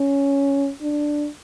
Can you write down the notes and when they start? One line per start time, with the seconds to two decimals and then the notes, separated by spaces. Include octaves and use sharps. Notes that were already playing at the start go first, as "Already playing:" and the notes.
Already playing: C#4
0.82 D4